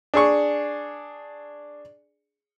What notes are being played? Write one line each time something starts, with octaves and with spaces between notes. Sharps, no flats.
D4 G#4 C#6